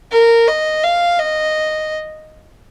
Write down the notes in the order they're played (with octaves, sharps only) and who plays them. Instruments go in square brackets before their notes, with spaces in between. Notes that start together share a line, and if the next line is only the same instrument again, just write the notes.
[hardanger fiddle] A#4
D#5
F5
D#5